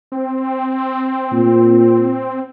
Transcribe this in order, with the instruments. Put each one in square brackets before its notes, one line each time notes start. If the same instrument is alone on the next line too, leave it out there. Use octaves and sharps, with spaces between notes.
[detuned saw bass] C4
[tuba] A#2